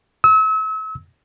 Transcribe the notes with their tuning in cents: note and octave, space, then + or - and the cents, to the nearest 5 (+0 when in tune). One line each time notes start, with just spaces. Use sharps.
E6 -40